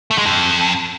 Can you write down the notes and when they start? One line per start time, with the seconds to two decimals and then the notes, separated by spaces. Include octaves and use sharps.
0.11 A3
0.18 G#3
0.26 F2